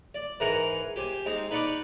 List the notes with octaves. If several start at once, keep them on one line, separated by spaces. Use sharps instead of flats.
D5
G#2 E3 A#4 F#5 G#5 A#5
G4 C5 G#5
G#3 C4 D#4
D#4 B4 D5 F#5 C#6 D6